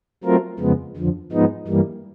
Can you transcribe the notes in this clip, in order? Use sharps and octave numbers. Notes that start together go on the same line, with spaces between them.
F#3 A3 C4 F4 A#4
F2 C#3 F3 G#3 B3
F2 D3 F3
G#2 F3 G#3 B3 D#4
G2 E3 G3 A#3